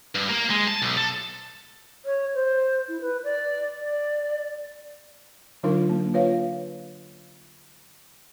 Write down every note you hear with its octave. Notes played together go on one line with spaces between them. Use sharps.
G2
A#3
G#3
A5
B1
A4
C#5
C5
E4
B4
D5
D5
D3 F#3 D4 D#4 F4 A#4
A#3
F4 B4 C#5 F5